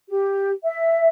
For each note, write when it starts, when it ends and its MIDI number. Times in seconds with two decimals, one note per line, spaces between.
0.09 0.51 67
0.63 1.08 76